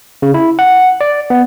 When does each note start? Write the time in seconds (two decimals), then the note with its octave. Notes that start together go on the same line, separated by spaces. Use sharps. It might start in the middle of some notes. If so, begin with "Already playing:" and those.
0.22 C#3
0.34 E4
0.59 F#5
1.01 D5
1.30 B3